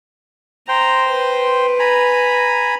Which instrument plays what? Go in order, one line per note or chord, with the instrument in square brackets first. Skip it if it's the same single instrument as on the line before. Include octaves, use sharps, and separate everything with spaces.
[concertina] C5 G5 [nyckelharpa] A#5
[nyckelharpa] B4
[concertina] G#5 A#5 B5